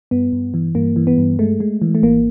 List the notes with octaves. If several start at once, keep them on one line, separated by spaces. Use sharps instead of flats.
G2 B3
G2
E3
G2 A#3
E3
B3
G2
G#3 A3
G#3
E3
A3
G#1 A#3